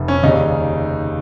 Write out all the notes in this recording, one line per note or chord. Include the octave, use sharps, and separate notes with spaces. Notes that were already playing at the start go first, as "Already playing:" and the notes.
Already playing: F1
C#4
D#2 C#3 G3 D#4